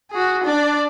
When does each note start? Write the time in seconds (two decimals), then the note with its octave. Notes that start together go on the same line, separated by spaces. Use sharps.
0.11 F#4 G#4
0.44 D4 D5